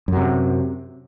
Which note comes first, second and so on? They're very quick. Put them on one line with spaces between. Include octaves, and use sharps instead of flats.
F#2 F#3 C3